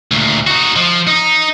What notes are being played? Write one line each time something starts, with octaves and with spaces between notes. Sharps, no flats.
D2 A#2
D#4 F#4
F3
D#4